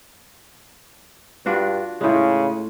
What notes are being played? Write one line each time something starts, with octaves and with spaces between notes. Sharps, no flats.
G2 D4 F4 F#4
A2 C#3 G#3